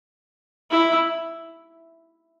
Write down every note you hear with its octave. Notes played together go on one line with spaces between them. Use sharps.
E4